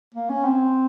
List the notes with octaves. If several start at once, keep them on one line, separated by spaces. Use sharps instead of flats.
A#3
C#4
C4